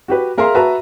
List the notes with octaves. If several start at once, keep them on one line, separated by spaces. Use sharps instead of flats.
F#4 G4 B4
G#4 A#4 E5 F5 A#5 C6
F#4 B4 E5 A5 A#5